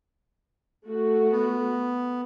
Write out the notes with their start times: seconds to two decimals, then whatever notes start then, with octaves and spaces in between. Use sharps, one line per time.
0.85 A3 F#4
1.32 B3